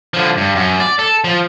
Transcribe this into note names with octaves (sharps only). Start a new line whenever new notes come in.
D3 F3
G2
F#2
D5
A4
F3